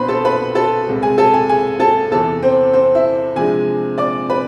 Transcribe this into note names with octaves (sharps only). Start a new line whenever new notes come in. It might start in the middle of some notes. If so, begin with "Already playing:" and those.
Already playing: C2 B2 B3 D4 B4 C5 B5 C6
A4 A5
B4 B5
A4 A5
C2 C3 G#3
G#4 G#5
A4 A5
G#4 G#5
G#4 G#5
A4 A5
E2 C3 E3 A4 A5
C4 C5
C4 C5
E4 E5
C3 F3 G#3 D4 G#4 G#5
D5 D6
B4 B5